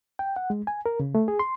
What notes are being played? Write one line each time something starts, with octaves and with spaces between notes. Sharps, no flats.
G5
F#5
G#3
G#5
A#4
C#3
A3
G#4
C6